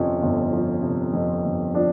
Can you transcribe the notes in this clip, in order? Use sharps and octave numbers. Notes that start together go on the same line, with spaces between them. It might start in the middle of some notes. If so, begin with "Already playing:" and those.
Already playing: G1 F2 C3 F3 C4 C#4
G1
F3
C3
F2
G1
F3 D4